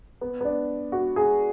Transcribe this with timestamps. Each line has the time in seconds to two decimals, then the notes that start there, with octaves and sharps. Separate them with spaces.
0.21 B3
0.41 B3
0.45 D4
0.92 F#4
1.16 G#4